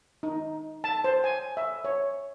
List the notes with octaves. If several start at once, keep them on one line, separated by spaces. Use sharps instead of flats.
D#4
A5
C5
G#5
E5
C#5